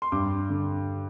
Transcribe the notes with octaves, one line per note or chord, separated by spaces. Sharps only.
C6
G2 D6
D3